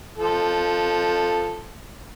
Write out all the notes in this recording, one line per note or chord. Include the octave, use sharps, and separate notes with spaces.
F3 A4